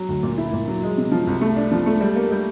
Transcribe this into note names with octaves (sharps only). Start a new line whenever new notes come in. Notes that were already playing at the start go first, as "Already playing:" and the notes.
Already playing: F#3
D2
A#2
E4
A#2
F#3
G#3
C3
F3
C2
A3
D4
F3
A3
G3
A#3
G3